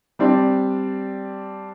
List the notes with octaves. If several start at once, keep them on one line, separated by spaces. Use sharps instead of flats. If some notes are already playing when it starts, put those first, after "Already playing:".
G3 C4 D4